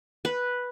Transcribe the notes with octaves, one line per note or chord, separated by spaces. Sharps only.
B4